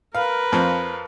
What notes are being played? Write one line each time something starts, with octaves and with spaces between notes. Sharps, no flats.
A#4 B4 F5
F2 F3 C4